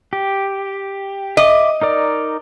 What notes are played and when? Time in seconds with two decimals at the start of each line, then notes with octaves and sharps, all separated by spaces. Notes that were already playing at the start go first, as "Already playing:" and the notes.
0.13 G4
1.37 D#5 E5 D6
1.82 D#4 A#4 D5